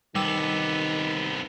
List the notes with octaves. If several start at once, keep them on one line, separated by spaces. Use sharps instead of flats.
C2 D#3 G3 B3 E6